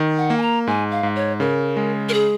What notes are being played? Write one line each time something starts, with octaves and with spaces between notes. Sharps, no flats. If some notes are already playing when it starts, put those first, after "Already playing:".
Already playing: D#3
F#5
A#3
G#5
A#5
G#2 G#5
F5
G#2
C#5
C#3 A#4
G#3
A#4
G#4